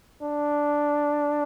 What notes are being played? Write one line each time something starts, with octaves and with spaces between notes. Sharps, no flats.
D4